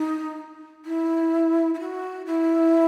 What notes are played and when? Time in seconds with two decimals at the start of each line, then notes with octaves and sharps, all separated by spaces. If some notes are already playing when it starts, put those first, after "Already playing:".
Already playing: D#4
0.85 E4
1.74 E4
1.79 F#4
2.26 E4